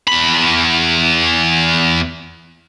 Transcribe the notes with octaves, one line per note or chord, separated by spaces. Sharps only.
E2 B5